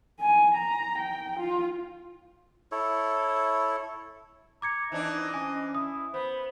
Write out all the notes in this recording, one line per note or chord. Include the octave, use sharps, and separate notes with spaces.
G#5
A#5
G5
F4
E4 A4 C#5
A#5 D6 G#6 C#7
E3 C4 D4 D#4 D#5
C#4 G#5
E4 D#6
B3 C5 B5